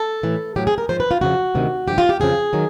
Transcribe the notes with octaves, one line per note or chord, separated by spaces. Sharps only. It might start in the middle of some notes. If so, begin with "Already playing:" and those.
Already playing: A4
A2 E3
A2 F#3 G4
G#4
A#4
G#2 F3 C5
B4
F4
F2 C#3 F3 F#4
D2 C3 D#3
G2 D3 F3 G4
F4
G4
F2 C#3 F3 G#4
D#3 F#3